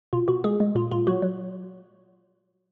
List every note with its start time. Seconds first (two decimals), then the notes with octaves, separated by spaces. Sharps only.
0.13 B2 F4
0.28 B2 F#4
0.44 G#3 G#4
0.60 G#3
0.75 A#2 F4
0.91 A#2 F4
1.07 F#3 F#4
1.22 F#3